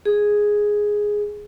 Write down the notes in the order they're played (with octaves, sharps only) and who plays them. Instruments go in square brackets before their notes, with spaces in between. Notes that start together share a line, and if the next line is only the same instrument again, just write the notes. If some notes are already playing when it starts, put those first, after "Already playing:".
[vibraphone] G#4